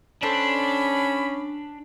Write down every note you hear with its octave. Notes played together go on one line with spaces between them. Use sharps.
C#4 D4 A4 C5 B5